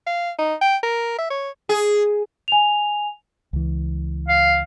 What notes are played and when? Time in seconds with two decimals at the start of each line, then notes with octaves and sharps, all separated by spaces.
0.06 F5
0.38 D#4
0.61 G5
0.83 A#4
1.18 E5
1.30 C#5
1.69 G#4
2.48 G#5 F7
3.53 C#2 E3
4.28 F5